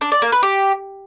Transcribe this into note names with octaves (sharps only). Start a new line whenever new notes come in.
D4
D5
A#3
B4
G4